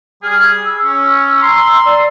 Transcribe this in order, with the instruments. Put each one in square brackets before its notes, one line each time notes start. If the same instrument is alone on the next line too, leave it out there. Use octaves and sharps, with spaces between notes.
[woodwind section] G3 G#4 [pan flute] F6
[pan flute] E6
[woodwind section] C#4
A#5 C6
[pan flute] D5